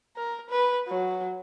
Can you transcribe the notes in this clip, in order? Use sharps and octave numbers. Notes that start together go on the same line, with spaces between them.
A#4
B4
F#3